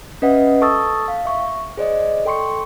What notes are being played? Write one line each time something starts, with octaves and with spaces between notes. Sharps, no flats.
C#4 B4 D#5 E5 F#5
A4 A5 C#6 D#6 E6 A6
F5
E5 C#6
G#4 C5 D5 D#5
A4 G5 C6 C#6 C#7